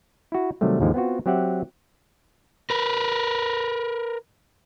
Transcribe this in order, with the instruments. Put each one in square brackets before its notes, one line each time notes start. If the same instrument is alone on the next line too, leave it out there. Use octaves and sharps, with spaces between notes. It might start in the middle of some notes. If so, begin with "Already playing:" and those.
[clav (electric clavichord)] E4 F#4
C3 D#3 F#3 G3 A3
D#2 G#2 D3 F3 G#3
B3 C4 F4 F#4
F#3 C4 G4 E5 F#5
[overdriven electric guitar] A#4 B4